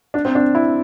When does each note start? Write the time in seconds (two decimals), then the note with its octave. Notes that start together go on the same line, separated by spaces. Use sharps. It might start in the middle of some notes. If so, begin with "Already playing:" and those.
0.14 D4
0.25 C4
0.35 D4
0.55 E4